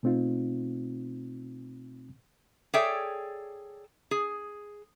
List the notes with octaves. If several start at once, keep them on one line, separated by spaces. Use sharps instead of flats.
B2 A3 C4 D#4 F4
G#4 A4 C#5 D5 E5 G5
G#4